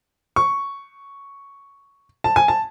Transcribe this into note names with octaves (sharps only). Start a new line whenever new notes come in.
C#6
A5
G#5
A5